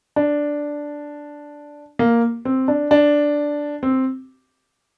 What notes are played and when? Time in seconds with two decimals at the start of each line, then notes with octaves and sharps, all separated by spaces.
0.16 D4
1.99 A#3
2.45 C4
2.68 D4
2.91 D4
3.83 C4